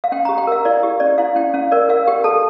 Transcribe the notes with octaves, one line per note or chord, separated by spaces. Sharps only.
F5
C#4 G5
A#5
G4
G5
A#4 F5
E4 D5
G4
C#4 D5
E4 F5
C#4 G5
C#4 F5
A#4 D5
A#4 F5
G4 G5
A4 A5